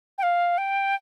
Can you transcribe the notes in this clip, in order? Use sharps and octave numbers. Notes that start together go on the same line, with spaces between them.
G5
F5
G5